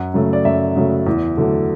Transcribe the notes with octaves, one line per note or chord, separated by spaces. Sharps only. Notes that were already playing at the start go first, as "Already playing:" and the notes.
Already playing: F#2 F#5
C#3 F#3 A3
D5
F#2 E5
C#3 F#3 A3
E2
D3 F#3 A3